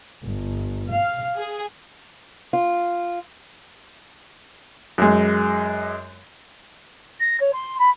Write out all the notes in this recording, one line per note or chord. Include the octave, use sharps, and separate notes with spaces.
G1
F5
G#4
F4
F#2 G#3
A#6
C#5
C6
B5